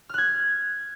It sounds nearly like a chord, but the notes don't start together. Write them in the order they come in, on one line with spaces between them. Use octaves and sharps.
F6 F#6 G#6